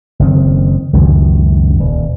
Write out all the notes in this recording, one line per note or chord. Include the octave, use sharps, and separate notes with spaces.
F#1 D#3 C4
C#2 F#2 D#3
D#1